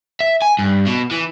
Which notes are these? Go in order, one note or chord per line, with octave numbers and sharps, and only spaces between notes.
E5
G#5
G2
B2
E3